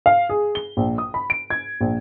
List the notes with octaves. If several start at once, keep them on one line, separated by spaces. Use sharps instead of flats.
F5
G#4
G7
A#1
D#6
B5
D7
G#6
A#1